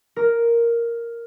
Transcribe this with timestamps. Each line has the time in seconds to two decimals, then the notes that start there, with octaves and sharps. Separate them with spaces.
0.16 A#4